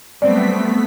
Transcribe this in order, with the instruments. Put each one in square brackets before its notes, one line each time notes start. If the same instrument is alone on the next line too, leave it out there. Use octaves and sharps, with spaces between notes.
[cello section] F#3 G3 C4 [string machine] A3 B3 B6 [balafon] D5